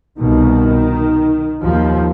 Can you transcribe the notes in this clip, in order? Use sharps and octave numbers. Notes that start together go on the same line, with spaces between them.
C2 B2 D#3
D#2 F3